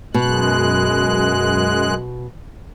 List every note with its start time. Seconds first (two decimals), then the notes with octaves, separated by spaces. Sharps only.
0.14 F#2 B2 G#3 F#6